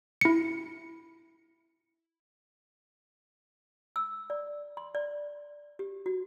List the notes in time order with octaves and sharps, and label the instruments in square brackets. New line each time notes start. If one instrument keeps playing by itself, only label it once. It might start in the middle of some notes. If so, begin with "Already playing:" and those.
[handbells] E4 C#7
[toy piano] E6
D5
C6
D5
G4
F#4